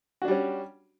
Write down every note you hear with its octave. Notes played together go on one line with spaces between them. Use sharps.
G3 C#4 D4 F#4